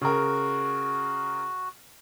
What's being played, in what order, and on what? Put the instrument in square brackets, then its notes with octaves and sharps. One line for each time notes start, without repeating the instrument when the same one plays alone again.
[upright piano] C#3 A#4 [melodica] F#4